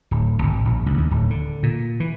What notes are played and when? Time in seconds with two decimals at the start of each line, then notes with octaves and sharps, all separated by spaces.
0.11 D1
0.43 G#1
0.65 A#1
0.86 C#2
0.98 D#2
1.11 D1
1.30 D3
1.63 A#2
2.00 E3